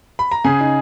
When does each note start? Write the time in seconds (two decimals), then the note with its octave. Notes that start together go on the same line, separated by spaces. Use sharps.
0.19 B5
0.31 A#5
0.44 C#3 G#4 G#5
0.60 D#4